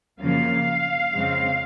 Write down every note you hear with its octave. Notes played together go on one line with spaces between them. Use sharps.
F#2 C#3 F3 A#3 F5
F2 C#3 G#3 C4